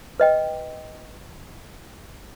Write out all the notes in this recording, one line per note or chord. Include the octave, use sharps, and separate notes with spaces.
B4 D#5 G5